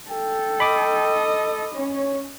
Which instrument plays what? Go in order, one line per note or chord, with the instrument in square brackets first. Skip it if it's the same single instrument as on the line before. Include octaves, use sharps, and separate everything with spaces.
[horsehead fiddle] A4 [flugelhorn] G5
[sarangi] D#5 [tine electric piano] B5 D6
[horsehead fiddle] C#4 [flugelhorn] C#5